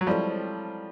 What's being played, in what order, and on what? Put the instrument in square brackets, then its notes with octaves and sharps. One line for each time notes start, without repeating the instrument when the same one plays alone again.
[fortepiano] F#3
[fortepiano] F3 G3 [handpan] G#3 C4 E4 A4 C#5